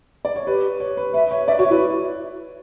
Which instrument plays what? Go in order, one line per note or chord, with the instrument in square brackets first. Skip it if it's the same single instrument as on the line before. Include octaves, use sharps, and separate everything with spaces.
[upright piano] D5
C#5
[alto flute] G4 [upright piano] B4
[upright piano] C#5
B4
[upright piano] B4 [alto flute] E5
[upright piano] C#5
[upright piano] D5 [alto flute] E5
[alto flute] F#4 [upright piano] C#5
[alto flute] E4 [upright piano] B4